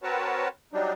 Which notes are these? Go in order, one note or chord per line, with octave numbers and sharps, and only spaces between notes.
C4 F#4 A#4 B4 C#5 A5
F#3 G3 D4 D#4